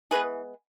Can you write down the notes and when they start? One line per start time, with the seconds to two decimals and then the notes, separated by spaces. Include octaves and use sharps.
0.11 E3 G#3 B3 G#4 B4